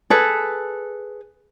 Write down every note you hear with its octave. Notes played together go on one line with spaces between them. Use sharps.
G#4 A4 B4